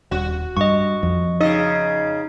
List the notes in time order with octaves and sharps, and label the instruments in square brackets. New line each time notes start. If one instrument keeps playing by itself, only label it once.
[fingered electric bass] D#1 [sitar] F#4
[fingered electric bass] G2 [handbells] D#5 C#6
[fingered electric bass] F2
[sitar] C#3 D#5 [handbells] D#4